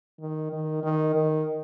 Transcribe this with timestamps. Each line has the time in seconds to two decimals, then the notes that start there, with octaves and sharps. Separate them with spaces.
0.20 D#3
0.52 D#3
0.83 D#3
1.14 D#3